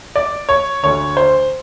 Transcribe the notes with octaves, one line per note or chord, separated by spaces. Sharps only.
D5
C#5
D2 D3 C#5
C5